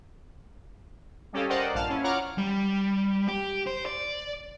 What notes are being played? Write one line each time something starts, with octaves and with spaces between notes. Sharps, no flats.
G3 C#4 G4 A4 D#5 F5
A#4 C5 D5 D#5 F#5 G5
A#1 G2 F5 A5 F6
C#4 E4
F4 C#5 F#5 A#5 D6 F6
G3
G4
C5
D5